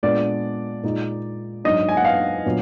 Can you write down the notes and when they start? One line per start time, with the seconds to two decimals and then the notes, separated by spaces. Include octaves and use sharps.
0.03 A#2 G#3 B3 D4 D5
0.83 A#2 G#3 D#4
1.64 G#2 F#3 D4 D#5
1.89 G#5
1.97 F#5
2.05 F5
2.45 A#2 F#3 B3 D4